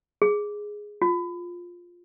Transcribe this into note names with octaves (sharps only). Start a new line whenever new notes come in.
G#4
F4